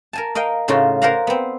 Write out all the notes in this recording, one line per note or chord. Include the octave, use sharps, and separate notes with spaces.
A#4 G#5 A5
A#4 D#5 F5 G5
A2 C#3 D#4 F4 F#4
A#4 C5 D5 F5 F#5 A#5
B3 C4